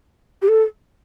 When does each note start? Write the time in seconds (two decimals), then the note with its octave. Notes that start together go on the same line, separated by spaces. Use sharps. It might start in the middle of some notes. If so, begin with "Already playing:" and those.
0.42 G4
0.48 A4